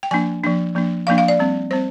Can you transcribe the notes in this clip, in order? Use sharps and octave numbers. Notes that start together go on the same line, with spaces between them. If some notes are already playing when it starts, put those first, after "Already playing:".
G5
F3 A#3 D4 G#5
F3 A#3 D4
F3 A#3 D4
F3 A#3 D4 F5
F5
D5
G3 C4
G3 C4 C5